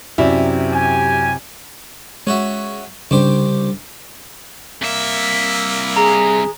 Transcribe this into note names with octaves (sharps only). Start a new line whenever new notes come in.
F#2 C3 F#3 E4 D5
G4 G#5
G#3 C#4 F#4 E5
C2 C#3 D4 G4 C5
C2 A#3 E5
G#4 A#5